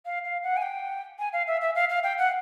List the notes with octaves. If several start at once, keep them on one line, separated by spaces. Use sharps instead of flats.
F5
F5
F#5
G#5
G5
G#5
F5
E5
E5
F5
F5
G5
F#5